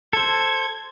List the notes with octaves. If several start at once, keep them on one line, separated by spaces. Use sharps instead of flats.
A4 C5 G#6